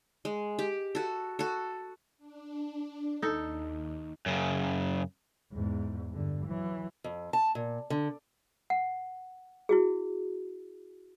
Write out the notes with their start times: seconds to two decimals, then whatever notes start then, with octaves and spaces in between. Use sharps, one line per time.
0.25 G#3
0.59 G4
0.95 F#4 A4
1.39 F#4 A4
2.18 D4
3.22 D#2 D#4 A4
4.26 F#2 C#3
5.53 E2 G#2
6.11 G2 D3
6.46 E3 F#3
7.04 F2
7.33 A5
7.55 A#2
7.90 D3
8.70 F#5
9.69 E4 F#4 G#4